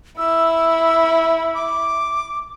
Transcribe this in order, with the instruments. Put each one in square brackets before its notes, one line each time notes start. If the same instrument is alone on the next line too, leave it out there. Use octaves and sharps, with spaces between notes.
[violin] E4 [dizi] E6
[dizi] D6